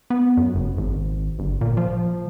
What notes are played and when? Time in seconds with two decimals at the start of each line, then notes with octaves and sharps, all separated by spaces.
0.10 B3
0.37 F#2
0.55 F#1
0.78 G#1
1.39 G1
1.61 A#2
1.77 F3